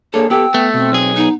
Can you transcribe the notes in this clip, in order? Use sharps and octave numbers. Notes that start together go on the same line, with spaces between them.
A#3 D4 G#4 A4 C#5
B3 G4 A4 G5 E6
A3 B3
B2 C4
B1 G#4
B3 D#4